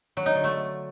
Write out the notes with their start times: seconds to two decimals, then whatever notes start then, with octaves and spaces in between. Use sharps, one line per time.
0.17 F#3
0.26 D#4
0.35 D3
0.44 A3